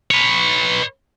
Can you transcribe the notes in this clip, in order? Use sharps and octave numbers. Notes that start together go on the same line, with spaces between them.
B4 C#5